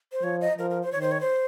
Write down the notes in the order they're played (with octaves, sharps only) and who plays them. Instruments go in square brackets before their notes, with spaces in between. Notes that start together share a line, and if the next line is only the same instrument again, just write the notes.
[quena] C5
[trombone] F3 [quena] C#5
[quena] D#5
[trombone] F3 [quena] A#4
[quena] A#4
C5
[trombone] D#3 [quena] C#5
[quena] C5
C#5
C5